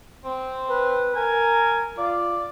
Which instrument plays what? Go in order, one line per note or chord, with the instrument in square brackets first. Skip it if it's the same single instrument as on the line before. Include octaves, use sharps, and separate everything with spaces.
[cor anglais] C4
[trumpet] B4
[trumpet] A#4 [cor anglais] G#5
[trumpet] F4 [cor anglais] D5